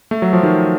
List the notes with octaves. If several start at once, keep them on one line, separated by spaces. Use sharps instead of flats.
A3
F#3
F3
D#3 F#3